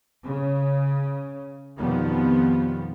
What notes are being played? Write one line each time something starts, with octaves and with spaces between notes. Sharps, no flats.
C#3
F2 B2 D#3 F3 G3 B3